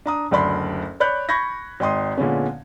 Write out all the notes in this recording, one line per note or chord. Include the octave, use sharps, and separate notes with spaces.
D4 A#5 D#6
F#1 D2 D5 B5 C6
C#5 D5 B5 F#6 G6
B5 C#6 G6 G#6 A#6
G#1 D#5 G5 C6 D#6
A#2 D3 G#3 B3 C#4